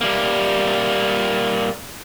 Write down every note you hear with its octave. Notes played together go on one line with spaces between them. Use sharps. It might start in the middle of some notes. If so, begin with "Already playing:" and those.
G3 A#3